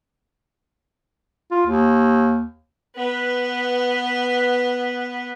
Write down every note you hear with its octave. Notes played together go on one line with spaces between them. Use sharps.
F4
D#2
B3 B4